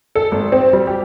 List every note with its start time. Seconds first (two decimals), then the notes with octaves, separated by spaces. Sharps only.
0.15 A4
0.32 G#1
0.52 C4
0.73 G3
0.87 G4